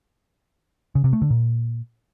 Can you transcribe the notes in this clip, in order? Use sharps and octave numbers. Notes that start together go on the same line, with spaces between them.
C#3
C3
A3
D3
A#2